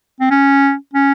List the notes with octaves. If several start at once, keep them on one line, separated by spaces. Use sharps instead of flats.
C4
C#4
C#4